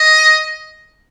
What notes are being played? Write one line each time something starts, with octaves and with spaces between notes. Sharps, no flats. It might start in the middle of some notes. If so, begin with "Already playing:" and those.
Already playing: D#5